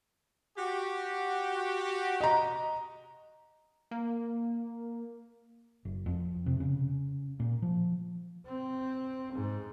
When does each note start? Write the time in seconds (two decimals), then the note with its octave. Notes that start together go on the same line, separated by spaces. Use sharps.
0.57 F#4 G4
2.21 D#5 A#5
3.91 A#3
5.85 F#1
6.06 F2
6.46 C3
6.60 C#3
7.40 A#2
7.62 F3
8.46 C4
9.33 G#2